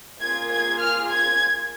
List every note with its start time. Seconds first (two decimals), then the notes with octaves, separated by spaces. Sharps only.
0.20 A#3 F4 G#4 G#6
0.50 G#6
0.79 F6
1.09 G#6